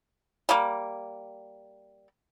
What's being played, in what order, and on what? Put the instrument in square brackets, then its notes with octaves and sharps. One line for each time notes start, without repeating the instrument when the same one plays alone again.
[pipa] G3 A#3